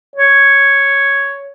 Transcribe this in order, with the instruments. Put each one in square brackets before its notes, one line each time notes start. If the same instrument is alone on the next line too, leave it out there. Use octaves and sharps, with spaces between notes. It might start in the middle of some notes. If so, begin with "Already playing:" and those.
[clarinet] C#5